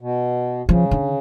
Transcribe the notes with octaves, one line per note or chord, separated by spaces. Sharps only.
B2
C#3 F3
D3